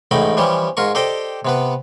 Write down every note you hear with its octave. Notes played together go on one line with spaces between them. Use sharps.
A1 G#2 A3 D#4 G5 B5
E3 F3 G3 C#4 G4
G#2 F4 A#4 C#6
G4 A4 C5 D5 D#5 G5
C3 B3 B4